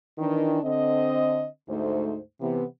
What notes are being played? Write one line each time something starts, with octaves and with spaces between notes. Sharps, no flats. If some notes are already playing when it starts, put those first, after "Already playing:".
D#3 E3 D4
D3 C4 D#5
D2 G#2 A3 D#4 C5
C3 E3 B3